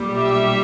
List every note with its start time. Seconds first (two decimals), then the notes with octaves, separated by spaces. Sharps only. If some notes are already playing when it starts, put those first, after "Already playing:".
Already playing: B1 A#2 G3
0.16 E5